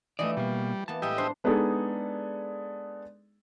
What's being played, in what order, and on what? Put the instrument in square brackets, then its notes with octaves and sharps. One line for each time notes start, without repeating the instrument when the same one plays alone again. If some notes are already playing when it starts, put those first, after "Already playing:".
[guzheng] E3 F3 G4 [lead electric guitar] A3 D5 [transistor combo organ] D#5
[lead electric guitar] B2 A#3 [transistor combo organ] G3
[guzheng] E3 A#3 B3 [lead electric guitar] A5
[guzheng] A2 G3 G#3 [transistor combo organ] G4 D#5 E5
[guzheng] D4 [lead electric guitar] C5
[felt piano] G#3 B3 D4 D#4 G#4 A4